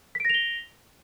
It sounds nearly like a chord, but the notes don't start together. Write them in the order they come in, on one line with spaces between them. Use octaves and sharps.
B6 D7 A#6 F7 G7